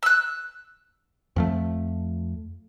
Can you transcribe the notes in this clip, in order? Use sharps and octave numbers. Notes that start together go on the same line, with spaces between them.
E6 F#6
F2 F3 A3